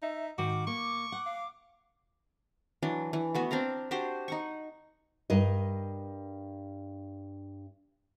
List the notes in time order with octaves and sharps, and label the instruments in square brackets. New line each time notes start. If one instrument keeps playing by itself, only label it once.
[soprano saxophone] D#4 [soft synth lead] E5
[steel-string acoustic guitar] G#2 D#3 [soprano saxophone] F#4 [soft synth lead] D6
[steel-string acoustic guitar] A#3 [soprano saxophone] C#6
[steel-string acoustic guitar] F#5
[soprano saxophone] F5
[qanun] E3 F#3 D4
E3
A3 B3 F#4
C4 D4 F5 A#5
D4 F#4 G4 C5
D#4 F#5 C#6
[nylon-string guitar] G2 A#4 D#5